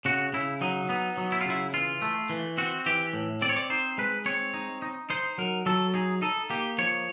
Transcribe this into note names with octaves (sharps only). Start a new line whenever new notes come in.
C#3 F#4
C#3 E4
F#3 D#4
B3 D#4
F#3
E4
F4
C#3 E4
E3 F4
A3
E3
C4 F#4
E3 G4
A2
C4 D5
C#5
D5
D#4 C5
G#3 B4
C4 C#5
D#4
D#4
D#4 C5
F#3 A#4
F#3 A4
D#4 G#4
D#4 A4
A#3 G4
F3 C#5